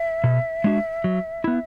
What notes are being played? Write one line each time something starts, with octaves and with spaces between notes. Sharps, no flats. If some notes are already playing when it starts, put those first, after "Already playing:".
Already playing: E5
B2
G#3 D4 F#4
F#3
B3 E4